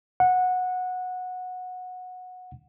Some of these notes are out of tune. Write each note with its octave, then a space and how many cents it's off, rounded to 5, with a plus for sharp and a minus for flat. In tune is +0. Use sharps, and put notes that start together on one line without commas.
F#5 -15